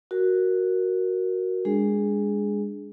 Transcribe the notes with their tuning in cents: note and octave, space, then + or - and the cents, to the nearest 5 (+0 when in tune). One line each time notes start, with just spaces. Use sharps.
F#4 +0 A#4 +0
G#3 -20 D4 +0 G#4 +0